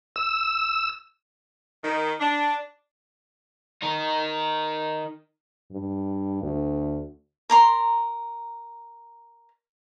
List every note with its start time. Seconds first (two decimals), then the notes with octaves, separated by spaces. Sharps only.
0.16 E6
1.84 D#3
2.20 D4
3.83 D#4 A#4
5.72 G2
6.42 D2
7.50 A#4 A#5 C6